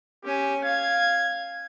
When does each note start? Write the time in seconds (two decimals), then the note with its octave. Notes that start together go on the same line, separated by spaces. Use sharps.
0.24 C#4 G4 G#5
0.64 F5 G#6